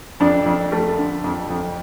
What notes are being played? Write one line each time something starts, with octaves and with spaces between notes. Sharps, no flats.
F2 D4
F2
A3
D3
F2
F2